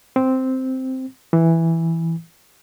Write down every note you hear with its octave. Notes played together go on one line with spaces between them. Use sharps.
C4
E3